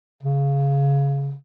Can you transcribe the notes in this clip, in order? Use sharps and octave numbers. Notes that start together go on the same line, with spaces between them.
C#3